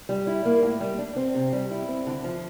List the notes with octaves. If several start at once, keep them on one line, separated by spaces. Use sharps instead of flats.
G3
E4
A#3
A2
G3
D4
C4
C3
G3
E4
C4
D3
F3